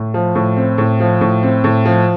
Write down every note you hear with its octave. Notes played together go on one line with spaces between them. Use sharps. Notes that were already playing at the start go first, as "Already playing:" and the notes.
Already playing: A2
F3
A2
C4
A2
F3
A2
C4
A2
F3